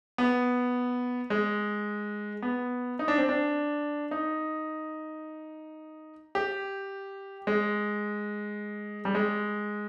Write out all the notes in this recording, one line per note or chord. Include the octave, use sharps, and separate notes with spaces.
B3
G#3
B3
D#4
D4
C4
D4
D#4
G4
G#3
G3
G#3